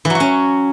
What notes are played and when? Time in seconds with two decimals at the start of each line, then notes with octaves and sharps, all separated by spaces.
0.05 E3
0.10 F#3
0.15 F#4
0.20 C#4